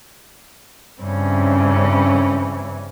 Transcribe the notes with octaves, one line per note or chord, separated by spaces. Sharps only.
G2 C#3 E3 C4 C#4